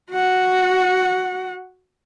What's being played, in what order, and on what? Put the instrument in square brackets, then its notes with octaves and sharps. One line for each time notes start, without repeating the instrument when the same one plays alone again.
[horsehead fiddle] F#4 F#5